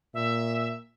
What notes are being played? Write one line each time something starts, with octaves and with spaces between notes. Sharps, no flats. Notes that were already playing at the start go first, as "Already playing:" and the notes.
A#2 E5